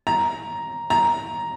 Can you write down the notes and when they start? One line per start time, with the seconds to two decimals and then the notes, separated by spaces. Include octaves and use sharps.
0.07 A#5
0.90 A#5